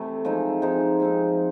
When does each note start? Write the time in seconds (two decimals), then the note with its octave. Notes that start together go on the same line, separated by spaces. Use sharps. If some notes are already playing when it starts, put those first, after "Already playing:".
Already playing: C3 E3 A3
0.25 F3 G#3 C4 D#4
0.62 F3 G#3 C4 D#4
1.00 F3 G#3 C4 D#4